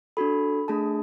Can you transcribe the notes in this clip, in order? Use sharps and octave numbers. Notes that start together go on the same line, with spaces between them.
D4 F#4 A4 B5
A3 D4 G#4 A5